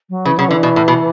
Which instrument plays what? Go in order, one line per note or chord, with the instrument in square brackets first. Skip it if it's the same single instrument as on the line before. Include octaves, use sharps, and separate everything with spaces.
[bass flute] F#3
[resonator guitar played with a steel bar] C#3 [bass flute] E3
[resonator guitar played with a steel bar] C#3 [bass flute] F#3
[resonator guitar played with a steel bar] D3 [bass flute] E3
[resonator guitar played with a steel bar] B2
A2
B2